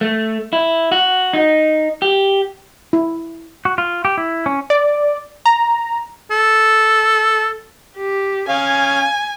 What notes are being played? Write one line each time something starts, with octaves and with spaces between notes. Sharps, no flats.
A3
E4
F#4
D#4
G4
E4
F#4
F4
G4
E4
C#4
D5
A#5
A4
G4
C#4 F5 G#5